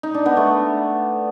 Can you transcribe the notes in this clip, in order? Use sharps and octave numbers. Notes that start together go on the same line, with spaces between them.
D#4
D4
B3
A3